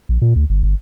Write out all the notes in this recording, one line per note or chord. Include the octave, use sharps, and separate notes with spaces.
A#1
A#2
D2
G1
G1